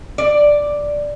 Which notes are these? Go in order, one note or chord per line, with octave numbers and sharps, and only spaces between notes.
D5